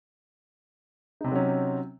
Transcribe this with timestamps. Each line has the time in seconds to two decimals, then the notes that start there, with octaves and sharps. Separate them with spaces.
1.21 D#4
1.24 C3
1.28 C4
1.32 F#3
1.35 C#4